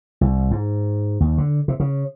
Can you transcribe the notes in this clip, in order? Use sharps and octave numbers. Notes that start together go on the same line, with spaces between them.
C2
G#2
D#2
D3
C3
C#3